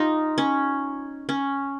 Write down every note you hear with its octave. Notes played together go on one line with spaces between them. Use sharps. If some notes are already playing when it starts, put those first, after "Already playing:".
Already playing: D#4 F4 G4
C#4
C#4